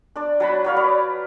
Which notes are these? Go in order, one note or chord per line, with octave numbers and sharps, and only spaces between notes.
D4 D5
F#3 A5 B5
F#3 C#5 F5
B4 D5